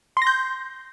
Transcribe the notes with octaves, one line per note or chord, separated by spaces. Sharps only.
C6 G6 A#6